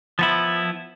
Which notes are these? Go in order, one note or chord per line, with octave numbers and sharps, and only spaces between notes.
F3 B3 E4